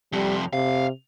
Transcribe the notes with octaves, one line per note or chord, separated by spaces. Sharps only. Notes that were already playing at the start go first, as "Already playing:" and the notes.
F2 C3 G3
C3 F5